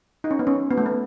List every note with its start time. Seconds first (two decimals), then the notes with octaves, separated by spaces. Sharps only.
0.24 D#4
0.31 C#4
0.39 B3
0.47 C#4
0.71 B3
0.78 A3
0.86 B3